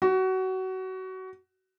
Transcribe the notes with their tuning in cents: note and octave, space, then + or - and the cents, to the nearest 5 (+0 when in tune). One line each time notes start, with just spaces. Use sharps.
F#4 +25